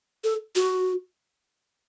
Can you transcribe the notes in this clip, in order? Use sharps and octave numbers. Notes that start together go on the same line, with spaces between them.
A4
F#4